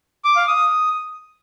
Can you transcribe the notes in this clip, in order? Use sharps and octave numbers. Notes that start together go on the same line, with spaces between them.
D6
F5
D#6